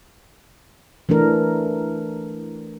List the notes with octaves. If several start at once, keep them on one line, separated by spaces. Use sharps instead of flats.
E3 A3 D4 A#4